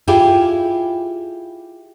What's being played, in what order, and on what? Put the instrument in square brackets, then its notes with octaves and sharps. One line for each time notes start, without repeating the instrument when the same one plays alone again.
[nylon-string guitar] E4 F4 G4 G#4